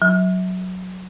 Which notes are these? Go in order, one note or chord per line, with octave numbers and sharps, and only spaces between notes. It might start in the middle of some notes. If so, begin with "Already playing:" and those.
F#3